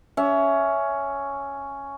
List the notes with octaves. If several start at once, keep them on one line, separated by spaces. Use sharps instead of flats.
C#4 E5